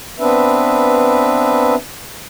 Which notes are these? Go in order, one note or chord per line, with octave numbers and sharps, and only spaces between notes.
B3 C4 D4 B4 E5